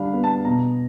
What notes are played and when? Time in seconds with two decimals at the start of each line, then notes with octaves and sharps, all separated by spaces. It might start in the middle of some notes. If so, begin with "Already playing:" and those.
Already playing: D3 G3 D4 F5 B5
0.13 B3
0.24 A5
0.45 B2 A#5